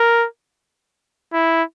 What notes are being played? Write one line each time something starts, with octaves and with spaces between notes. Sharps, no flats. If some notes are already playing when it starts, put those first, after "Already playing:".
Already playing: A#4
E4